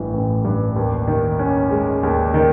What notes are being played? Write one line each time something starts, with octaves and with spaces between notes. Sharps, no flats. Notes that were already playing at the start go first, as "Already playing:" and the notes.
Already playing: A1 G2 E3 A3
A1
G2
D#2
D#3
C#4
G#3
D#2
D#3